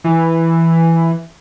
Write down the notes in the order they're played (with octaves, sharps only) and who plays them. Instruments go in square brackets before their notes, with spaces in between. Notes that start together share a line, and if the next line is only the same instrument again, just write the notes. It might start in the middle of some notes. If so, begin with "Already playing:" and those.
[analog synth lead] E3